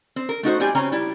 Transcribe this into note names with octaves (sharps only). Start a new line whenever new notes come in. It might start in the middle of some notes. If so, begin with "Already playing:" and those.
C4
A#4
A3 D#4 F#4 C5
G3 C4 G4 G#5
C#3 C4 C#4 G5 A#5
G3 E4